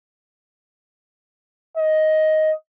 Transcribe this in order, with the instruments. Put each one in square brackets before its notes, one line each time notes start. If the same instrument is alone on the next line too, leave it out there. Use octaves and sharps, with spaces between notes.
[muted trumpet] D#5